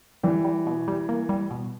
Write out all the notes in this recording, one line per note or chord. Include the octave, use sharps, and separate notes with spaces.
E3 G3
G3
B2
G3
A#3
G3
B2